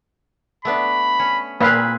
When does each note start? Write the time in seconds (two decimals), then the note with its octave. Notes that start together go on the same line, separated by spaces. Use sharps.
0.65 A3 B3 D4 B5
1.19 C#4
1.61 A#2 A#3 C4 G#4 B4 F5 B5